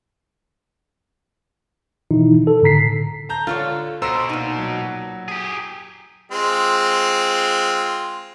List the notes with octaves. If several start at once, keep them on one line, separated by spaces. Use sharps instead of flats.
B2 D#3 E3 D#4 E4
A4
A2 D3 A#5 B6 C7
A5 A#5 G6
D3 F4 A4 C#5
B2 C5 A#5 E6 E7
A#2 D#4
F#3
G4 G#4
G#3 C4 F4